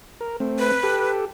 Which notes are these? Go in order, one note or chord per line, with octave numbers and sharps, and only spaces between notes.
A#4
A3 C4
B4
G4 A4